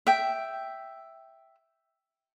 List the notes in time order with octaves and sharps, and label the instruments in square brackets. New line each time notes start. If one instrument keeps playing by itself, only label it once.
[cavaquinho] E5 G5